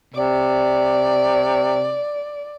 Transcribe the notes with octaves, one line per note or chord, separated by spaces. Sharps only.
C3 D5